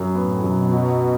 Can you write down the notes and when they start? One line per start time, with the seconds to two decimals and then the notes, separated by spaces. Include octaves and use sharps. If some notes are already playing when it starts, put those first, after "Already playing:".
Already playing: F#2 F#3
0.15 A2 B3
0.44 F#2 B2
0.73 F#3